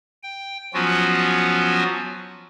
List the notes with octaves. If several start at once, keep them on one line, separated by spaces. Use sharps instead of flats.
G5
F3 F#3 B3 C#4 F4 F#4